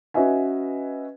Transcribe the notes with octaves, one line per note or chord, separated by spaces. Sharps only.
C#4 F#4 B4 D#5 E5 G#5